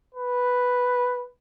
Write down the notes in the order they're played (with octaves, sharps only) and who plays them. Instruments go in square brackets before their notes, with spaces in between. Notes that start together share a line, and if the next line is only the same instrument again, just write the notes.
[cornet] B4